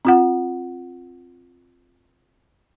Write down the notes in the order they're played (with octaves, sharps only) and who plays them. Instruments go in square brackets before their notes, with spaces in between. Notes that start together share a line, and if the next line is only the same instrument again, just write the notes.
[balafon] C4 F4 F#5